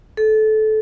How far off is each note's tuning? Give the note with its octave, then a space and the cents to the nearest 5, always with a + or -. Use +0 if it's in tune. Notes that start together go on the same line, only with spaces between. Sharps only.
A4 -20